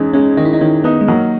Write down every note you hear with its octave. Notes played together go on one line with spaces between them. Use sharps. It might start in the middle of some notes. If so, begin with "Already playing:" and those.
Already playing: E2 G#3 C#4 D#4
G#3 C#4
D#3 D#4
E4
D#4
D#3 C#4
B3 D#4
G#3
F#3 A#3